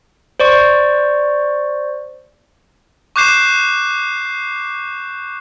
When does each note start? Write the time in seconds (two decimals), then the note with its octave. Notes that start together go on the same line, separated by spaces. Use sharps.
0.40 C5 D5 C#6
3.16 C#6 D6 F#6 G6 C7 E7